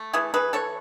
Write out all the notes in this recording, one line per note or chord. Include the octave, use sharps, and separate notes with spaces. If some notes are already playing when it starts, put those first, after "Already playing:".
Already playing: A3
E3 E4 G#4
E3 G#4 B4
E3 A4 C#5